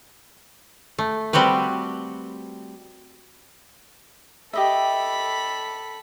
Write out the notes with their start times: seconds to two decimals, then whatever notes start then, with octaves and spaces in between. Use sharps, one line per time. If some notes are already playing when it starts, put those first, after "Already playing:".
0.99 A3
1.33 G3 C4 F#4 G4 B4
4.53 G4 A4 D#5 E5 B5